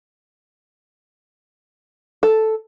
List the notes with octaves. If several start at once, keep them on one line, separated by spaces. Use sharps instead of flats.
A4